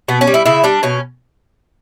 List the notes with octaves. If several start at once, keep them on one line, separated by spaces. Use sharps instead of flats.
B2 B3
C#4
G3
E4
C#3 E4
G3 D4
B2 C#4